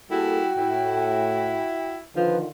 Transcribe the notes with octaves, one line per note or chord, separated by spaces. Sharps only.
G3 A#3 E4 F#4 G#4 A4 G5
A2 E4
D3 D#3 F3 F4 B4